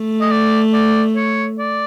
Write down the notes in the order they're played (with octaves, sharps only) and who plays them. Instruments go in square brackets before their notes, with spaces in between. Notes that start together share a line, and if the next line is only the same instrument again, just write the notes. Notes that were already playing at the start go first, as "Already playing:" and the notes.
Already playing: [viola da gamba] A3
[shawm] D#5
D5
D5
C#5
D5